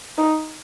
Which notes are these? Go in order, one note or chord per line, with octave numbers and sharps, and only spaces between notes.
D#4